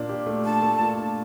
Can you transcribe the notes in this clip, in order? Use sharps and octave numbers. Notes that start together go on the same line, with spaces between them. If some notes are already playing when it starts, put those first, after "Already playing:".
Already playing: A#2 D4
G4
A3
D4 A5
A3
A#2
D4